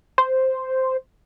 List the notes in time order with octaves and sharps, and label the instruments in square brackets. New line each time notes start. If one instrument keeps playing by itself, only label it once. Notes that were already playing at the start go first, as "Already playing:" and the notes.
[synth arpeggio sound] C5